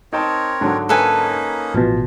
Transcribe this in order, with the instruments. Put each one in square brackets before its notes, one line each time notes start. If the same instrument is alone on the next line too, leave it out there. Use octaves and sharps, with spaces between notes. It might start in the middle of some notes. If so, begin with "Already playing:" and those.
[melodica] C4 A#4 C#5 [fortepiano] D#4 G5 A5
[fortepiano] G#2 D3 F#3
[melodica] A#3 C#4 D#4 [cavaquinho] A4 B4 G#5
[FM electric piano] A1 B2 [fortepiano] F3